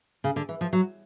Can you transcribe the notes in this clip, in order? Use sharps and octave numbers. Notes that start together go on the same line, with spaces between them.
C#3
D3
E3
F3
F#3